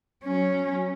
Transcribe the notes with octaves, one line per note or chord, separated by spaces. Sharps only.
F#3 C#4